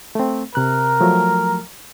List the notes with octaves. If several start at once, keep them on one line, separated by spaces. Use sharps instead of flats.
A3 C4
C3 A#4 F#6
F3 F#3 A3